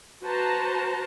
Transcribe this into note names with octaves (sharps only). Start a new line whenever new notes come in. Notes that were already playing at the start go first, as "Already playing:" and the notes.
F#4 B4 C5 A5 A#5